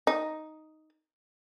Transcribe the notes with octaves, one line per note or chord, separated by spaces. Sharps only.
D#4